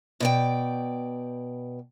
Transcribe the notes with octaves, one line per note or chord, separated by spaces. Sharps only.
B2 D5 G5